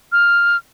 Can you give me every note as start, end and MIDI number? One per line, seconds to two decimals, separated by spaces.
0.12 0.57 89